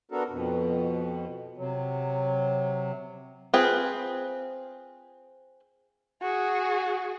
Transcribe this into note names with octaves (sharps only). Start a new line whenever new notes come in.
B3 D4 F#4 A4 A#4
F2 B2
C3 F#3
C4 F4 G#4 B4
F#4 G#4